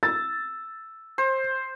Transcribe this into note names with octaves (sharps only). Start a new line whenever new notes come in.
E6 A6
C5